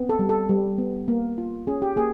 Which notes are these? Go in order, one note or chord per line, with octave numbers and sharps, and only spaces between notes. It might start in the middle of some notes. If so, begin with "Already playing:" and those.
Already playing: B3 C4
A4
G3
A4
G3
B3
A#3
F4
C#4 G#4
G4
A#3 G#4